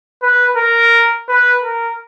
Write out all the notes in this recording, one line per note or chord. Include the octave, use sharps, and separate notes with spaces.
B4
A#4
B4
A#4